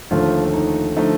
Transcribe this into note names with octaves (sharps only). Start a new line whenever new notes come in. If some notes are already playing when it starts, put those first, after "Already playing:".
D#2 D3 F3 A3 F4
D#4
D3 F3 A3 D#4